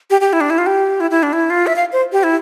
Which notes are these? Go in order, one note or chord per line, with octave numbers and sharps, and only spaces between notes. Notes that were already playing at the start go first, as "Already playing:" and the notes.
G4
G4
E4
D4
E4
F4
G4
E4
E4
D4
E4
F4
E5
F5
C5
G4
E4